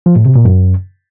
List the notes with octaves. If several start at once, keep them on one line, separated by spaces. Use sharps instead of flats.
F3
A2
C3
A#2
F#2